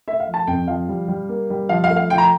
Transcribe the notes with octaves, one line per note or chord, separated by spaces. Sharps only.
A3 E5
F5
F3
A5
F2 G5
F3 F5
G3
G3
A#3
G3
F3 F5
F5
A3
F5
F3 G5
A#5